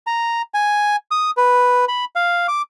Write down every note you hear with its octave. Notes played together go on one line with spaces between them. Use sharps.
A#5
G#5
D#6
B4
B5
F5
D6